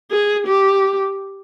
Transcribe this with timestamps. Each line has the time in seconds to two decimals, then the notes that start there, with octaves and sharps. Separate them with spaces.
0.11 G#4
0.47 G4